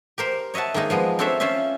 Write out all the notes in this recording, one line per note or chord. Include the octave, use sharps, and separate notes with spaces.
G4 A#4 C5
C#5 D#5 E5 F#5 A5
D#3 G#3 A#3 D#4
F3 G#3 B3 D#5
C4 D4 A4 C5 C#5 E5
C#4 F4 C5 E5